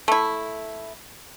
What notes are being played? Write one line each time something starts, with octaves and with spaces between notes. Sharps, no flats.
A3 E4